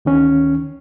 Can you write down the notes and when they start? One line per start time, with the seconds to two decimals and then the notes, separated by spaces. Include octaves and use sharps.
0.05 D2 D#3 C#4